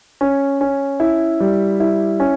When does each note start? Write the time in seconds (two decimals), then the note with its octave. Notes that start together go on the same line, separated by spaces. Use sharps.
0.21 C#4
0.61 C#4
1.00 E4
1.40 G3
1.80 E4
2.20 C#4